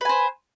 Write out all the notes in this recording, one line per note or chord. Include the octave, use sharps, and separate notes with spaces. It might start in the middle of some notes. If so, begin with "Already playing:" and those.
B4 C5 G#5